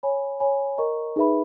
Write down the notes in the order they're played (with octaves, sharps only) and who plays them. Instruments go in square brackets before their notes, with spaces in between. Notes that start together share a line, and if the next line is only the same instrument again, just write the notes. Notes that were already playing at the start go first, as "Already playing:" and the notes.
[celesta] C#5 G#5 B5
C#5 G#5 B5
A#4 D#5 A#5 C#6
D#4 G#4 B4 E5 B5